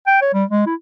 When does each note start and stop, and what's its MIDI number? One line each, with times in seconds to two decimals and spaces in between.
0.07 0.19 79
0.21 0.33 73
0.34 0.44 55
0.50 0.66 56
0.66 0.75 64